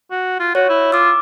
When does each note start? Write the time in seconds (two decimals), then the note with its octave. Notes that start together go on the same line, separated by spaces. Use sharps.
0.11 F#4
0.40 F4
0.55 F#4 C#5
0.69 E4
0.92 F4 D6 E6